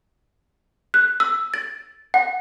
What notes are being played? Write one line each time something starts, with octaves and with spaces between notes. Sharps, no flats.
F#6
E6
A6
F#5